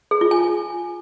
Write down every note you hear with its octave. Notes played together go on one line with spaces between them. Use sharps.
G#4
F4
G#5